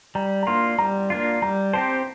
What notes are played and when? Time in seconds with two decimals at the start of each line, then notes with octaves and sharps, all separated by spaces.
0.15 G3 A#5
0.43 A#5
0.47 A#3 D4 F4 C6
0.78 G3 A#5
1.10 A#3 D4 F4
1.42 G3 A#5
1.73 C4 G4 C5 A5